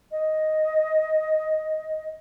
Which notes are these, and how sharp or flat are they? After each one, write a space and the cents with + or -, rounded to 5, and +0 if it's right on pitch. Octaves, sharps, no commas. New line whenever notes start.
D#5 +5